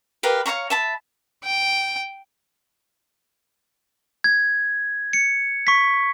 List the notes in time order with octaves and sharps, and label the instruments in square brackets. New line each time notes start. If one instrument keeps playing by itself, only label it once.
[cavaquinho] G4 A#4 B4 F5
C#5 F5 A#5 C#6
E5 A5 B5
[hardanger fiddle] G5
[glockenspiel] G#6
C#7
C#6 B6